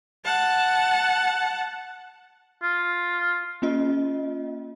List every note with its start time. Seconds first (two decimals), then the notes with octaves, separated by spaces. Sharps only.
0.25 F#5 A5
2.63 F4
3.62 A#3 C#4 F4 D#5